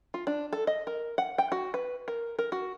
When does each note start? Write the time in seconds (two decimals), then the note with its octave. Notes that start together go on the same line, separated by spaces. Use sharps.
0.14 F4
0.27 D4
0.53 A4
0.67 D#5
0.87 A#4
1.18 F#5
1.38 G5
1.52 F#4
1.74 B4
2.08 A#4
2.39 A#4
2.52 F#4